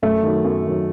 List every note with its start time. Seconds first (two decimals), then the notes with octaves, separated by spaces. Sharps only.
0.02 F#2 A3
0.23 D#3 F#3
0.44 F#2
0.65 D#3 F#3